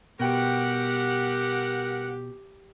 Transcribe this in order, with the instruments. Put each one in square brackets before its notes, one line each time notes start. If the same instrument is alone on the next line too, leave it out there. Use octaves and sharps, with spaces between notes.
[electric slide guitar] B2 G5 [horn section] G3 A#4 F#5 [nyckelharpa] G4